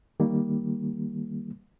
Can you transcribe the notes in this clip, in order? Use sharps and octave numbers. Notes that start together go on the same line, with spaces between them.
D#3 G3 A#3